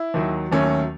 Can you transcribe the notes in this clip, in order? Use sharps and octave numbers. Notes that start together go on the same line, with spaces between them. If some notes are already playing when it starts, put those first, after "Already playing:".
Already playing: E4
D#2 D#3 F#3
D#2 D#3 F#3 A3 C#4